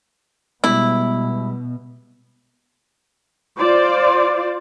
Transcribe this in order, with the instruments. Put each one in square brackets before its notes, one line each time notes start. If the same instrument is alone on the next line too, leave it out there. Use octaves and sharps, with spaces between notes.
[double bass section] B2 [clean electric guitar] G3 G#3 [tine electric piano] B3 [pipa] E4
[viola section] F4 C5 D5